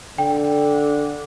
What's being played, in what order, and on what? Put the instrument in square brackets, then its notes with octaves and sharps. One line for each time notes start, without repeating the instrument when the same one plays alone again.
[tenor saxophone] D3 [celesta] G5